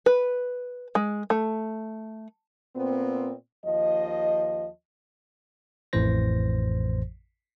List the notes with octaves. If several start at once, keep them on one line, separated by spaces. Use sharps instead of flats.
B4
G#3
A3
A#2 B3 C4
D#2 F3 D#5
A1 F2 A2 E3 C5 A#6